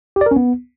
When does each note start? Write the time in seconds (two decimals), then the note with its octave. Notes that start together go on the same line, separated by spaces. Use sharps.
0.16 G4
0.21 D5
0.26 A#4
0.31 C#4
0.36 B3